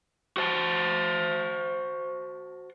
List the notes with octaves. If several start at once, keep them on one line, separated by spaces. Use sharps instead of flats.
F#4 C5 A5